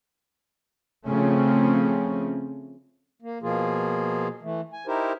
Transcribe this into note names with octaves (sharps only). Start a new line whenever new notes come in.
C#3 F3 A3 C4 C#4
A#3
B2 F3 A#3 F4 G#4
E3 A3
G#5
D#4 E4 G4 A#4 C5